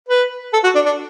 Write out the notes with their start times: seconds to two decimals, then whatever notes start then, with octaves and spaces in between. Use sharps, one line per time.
0.09 B4
0.53 A4
0.64 F#4
0.75 D4
0.86 D4